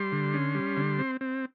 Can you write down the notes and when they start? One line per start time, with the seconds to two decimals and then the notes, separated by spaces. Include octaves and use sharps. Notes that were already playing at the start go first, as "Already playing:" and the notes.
Already playing: G3 C6
0.12 D3
0.34 C#4
0.55 G3
0.77 D3
0.99 C4
1.21 C4